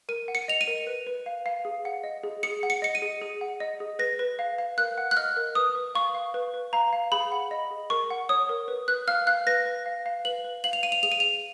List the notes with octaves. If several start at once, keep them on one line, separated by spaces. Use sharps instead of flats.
A#4 D#7
F#5
C#7
D#5 F7
D#7
A#4
B4
B4
F5
F5
G#4
F#5
D#5
G#4
G#4 C#7
F#5
C#7
D#5 C#7
D#7
G#4
G#4
F#5
D#5
G#4
B4 A#6
B4
F5
F5
A#4 F#6
F#5
F#6
D#5 F6
A#4
B4 D#6
B4
F5 C#6
F5
B4
B4
F5 A#5
F5
G#4 B5
F#5
D#5
G#4
A#4 C#6
F#5
C#5 D#6
A#4
B4
B4 F#6
F5 F6
F5 F#6
B4 A#6
B4
F5
F5
B4 F#7
B4
F5 F#7
F7
F5 D#7
F7
G#4 F7
D#7
F5 F7